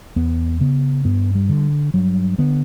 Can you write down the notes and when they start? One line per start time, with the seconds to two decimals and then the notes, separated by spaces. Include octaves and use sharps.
0.16 E2 B3
0.60 C#3 B3
1.05 G2 B3
1.35 G3
1.49 D3
1.94 G2 F#3
2.38 D3 B3